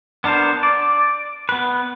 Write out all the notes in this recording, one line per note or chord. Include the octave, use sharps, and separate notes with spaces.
B3 D4 A#4 C5
D5
B3 B4